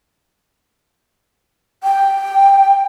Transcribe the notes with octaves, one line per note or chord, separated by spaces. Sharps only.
G5